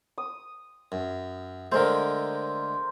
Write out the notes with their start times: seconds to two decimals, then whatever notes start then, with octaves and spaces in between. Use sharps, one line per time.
0.18 D#6
0.92 F#2
1.72 D3 G#3 A3 A#4 C5